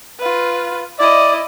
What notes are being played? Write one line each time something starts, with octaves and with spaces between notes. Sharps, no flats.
F4 B4
E4 D5 D#5